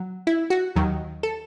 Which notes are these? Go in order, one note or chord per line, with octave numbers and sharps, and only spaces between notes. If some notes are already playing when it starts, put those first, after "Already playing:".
Already playing: F#3
E4
F#4
D#2 D#3 F#3
A4